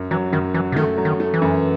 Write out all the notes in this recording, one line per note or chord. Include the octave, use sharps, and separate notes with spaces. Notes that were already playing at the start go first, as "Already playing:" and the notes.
Already playing: F#2
E3 F#3
F#2 D#3
E3 F#3
C3
D#3 A3
F#3
D#3
A3
E3
F#2